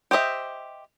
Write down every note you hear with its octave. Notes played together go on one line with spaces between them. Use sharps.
G4 C5 D#5 E5